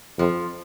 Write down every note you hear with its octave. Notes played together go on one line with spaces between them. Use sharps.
F2 F3